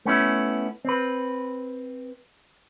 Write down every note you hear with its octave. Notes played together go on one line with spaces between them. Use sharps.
A3 B3 C#4 E4
C4 B4